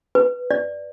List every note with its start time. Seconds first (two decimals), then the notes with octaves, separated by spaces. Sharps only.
0.15 B4
0.51 D5